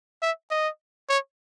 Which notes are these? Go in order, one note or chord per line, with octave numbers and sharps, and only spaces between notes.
E5
D#5
C#5